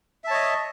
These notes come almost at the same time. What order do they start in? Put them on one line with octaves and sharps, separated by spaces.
E5 A5 C#5 D#5